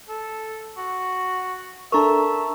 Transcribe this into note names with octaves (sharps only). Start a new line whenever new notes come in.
A4
F#4
D4 A4 A#4 E5 A5 A#5 C#6